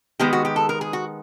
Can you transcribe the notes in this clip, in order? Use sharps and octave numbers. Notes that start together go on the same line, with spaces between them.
D#3 G#3 B3 G4
F#4
G4
A4
A#4
G#4
F#4